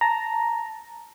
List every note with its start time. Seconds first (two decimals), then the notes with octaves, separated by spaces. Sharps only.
0.01 A5 A#5